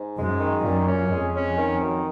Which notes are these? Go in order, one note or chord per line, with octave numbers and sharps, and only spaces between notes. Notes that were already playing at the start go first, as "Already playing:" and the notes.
Already playing: G#2
F#2 G#3
D#3
F#2 A#2
C#4
F2 G#3
C#4
D#3
F#2